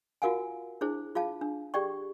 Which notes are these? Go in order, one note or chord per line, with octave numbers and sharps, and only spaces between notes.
F4 F#4 A#4 F5 F#5 G#5
D4 E4 G#4 C5
F4 G#4 F5 A5
D4
G4 G#4 D5 G5 C#6